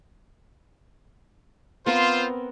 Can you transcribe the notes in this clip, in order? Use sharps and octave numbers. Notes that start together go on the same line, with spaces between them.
B3 C4 F4 A#4 C5